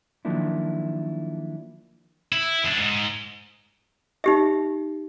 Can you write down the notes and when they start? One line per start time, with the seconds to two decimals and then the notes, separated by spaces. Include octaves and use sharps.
0.25 D#3 F3 F#3 A#3 D4 E4
2.32 E4
2.65 F#2 D4
2.78 G#2
4.24 D#4 G4 E5